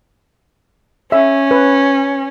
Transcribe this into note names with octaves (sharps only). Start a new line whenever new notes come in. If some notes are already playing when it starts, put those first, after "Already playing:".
C#4 E5
B4